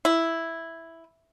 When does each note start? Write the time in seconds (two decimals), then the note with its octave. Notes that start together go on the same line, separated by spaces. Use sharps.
0.05 E4